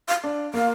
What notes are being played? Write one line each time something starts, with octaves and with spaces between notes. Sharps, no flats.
F5
D4
A#3 F5